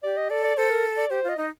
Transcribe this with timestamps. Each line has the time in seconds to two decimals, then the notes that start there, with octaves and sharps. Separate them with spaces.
0.03 G4 D5
0.17 D#5
0.30 A4 D5
0.44 D5
0.57 A4 C5
0.71 A#4
0.97 D5
1.10 G4 C5
1.24 F4 D#5
1.37 D#4 D#5